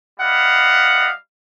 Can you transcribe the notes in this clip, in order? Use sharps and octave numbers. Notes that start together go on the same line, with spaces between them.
G3 E4 D#5 F5 F#5